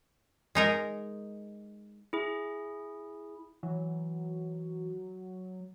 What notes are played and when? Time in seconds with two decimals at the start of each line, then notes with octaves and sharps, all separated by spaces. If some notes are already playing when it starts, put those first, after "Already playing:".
0.55 G#3 D#4 A#4
2.13 E4 G#4
3.63 E3 F#3